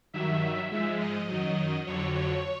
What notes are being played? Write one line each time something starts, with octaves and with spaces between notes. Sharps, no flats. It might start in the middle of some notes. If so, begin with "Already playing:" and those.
G2 D#3 F#3 E5
G#2 F3 G#3
D#5
F#2 D#3 F#3
F2 D3 F#3 C#5
C#5